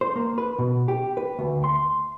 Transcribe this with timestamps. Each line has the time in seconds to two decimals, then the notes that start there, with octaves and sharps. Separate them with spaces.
0.01 C5
0.16 A#3
0.38 B4
0.58 B2
0.88 G4
1.17 B4
1.39 D2
1.64 C6